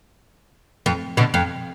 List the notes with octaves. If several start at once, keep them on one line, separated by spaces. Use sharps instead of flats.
F2
B2 D3
F2